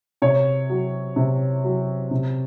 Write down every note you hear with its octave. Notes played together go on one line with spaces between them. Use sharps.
C3 C#5
F#3
C3
F#3
C3